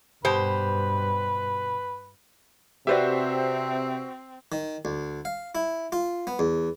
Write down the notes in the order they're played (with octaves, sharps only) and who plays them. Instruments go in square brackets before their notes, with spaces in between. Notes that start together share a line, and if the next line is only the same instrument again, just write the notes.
[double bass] G2 [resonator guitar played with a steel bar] B2 G4 C5 [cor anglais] B4
[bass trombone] C3 [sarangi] C4 [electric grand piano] F#4 C5 E5 [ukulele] G4 B4 D5
[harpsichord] D#3
D2
F5
E4
F4
B3
E2